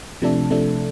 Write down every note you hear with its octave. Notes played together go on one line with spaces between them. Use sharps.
C3 F3 A3 D4 A4
C3 F3 A3 D4 A4